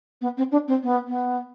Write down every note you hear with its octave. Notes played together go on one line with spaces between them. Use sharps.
B3
C4
D4
C4
B3
B3